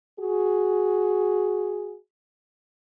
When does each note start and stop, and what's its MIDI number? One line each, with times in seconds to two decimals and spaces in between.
0.19 1.95 66
0.19 1.95 68